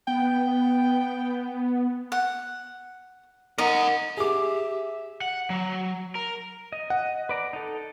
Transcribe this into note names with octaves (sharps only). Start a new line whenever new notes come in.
B3 G5
F#5
D#4 A#4 D#5 F#5
G4 G#4 E5 D6
F#5
F#3
A#4
D#5
F#5
B4 D5 A#5
D#4 A4